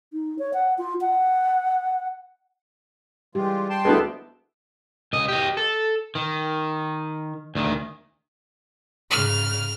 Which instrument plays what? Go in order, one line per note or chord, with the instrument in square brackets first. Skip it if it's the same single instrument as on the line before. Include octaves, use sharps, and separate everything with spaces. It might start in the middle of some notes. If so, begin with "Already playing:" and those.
[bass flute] D#4
C#5
F#5
F4
F#5
[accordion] E3 G#3 F4 [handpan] G3 G4
[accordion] G5 A5 C6
[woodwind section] D2 D4 [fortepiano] G#3 B3 [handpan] E4 A4 B4
[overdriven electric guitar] C#2 D#5
G4 D#5
A4
D#3
D2 D#3
[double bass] G#2 C#3 [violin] F6